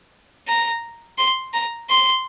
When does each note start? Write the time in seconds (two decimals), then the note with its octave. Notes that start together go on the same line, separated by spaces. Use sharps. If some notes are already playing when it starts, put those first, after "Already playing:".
0.48 A#5
1.18 C6
1.54 A#5
1.89 C6